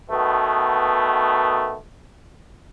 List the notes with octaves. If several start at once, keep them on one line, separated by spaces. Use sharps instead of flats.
B2 D#3 A3 B3